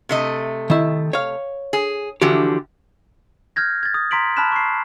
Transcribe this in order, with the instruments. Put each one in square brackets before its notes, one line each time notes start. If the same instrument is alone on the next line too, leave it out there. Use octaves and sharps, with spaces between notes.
[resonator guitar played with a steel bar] C3 A3 D#5
[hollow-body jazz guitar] D#3 E4
C#5 F5
[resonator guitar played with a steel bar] G#4
[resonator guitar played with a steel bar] D3 E3 F3 [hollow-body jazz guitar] F#4 G4
[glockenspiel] F6 G6 G#6 A#6
G#6 A6
D#6
A#5 C6 B6 D7 F#7
A5 B5 F6 F#6 B6 E7
C#6 C7